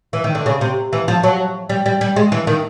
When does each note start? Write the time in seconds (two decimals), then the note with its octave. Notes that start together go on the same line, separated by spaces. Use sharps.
0.13 E3
0.24 D#3
0.35 D3
0.46 C#3
0.61 C3
0.93 E3
1.08 F3
1.23 F#3
1.69 G3
1.86 G3
2.01 G3
2.16 G#3
2.32 E3
2.47 D#3